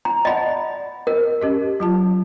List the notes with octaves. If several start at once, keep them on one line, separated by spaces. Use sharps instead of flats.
A#5
D5 D#5 F#5 A5 B5
A#4 D#5
C#4 G4 D#5
F#3 F4 A5